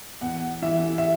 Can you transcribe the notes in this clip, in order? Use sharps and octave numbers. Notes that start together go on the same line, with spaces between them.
E2 F#5
E3 E5
E5